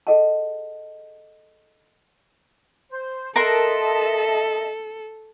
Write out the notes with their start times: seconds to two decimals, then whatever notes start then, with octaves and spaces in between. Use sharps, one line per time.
0.07 G#4 A4 D#5 F#5 A5
2.90 C5
3.36 A4 A#4 D#5 E5 F#5 A5 C6